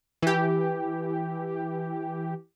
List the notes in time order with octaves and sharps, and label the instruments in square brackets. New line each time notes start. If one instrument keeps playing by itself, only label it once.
[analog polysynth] E3 G4